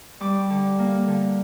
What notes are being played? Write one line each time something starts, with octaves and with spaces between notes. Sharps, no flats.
G3 D6
D3
A#3
D3